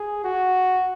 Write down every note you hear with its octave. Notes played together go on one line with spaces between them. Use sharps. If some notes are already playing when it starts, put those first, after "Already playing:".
Already playing: G#4
F#4